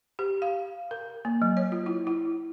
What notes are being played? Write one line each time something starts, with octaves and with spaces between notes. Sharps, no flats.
G4
F5
A#4
A#3
F#3
C#5
F4
E4
E4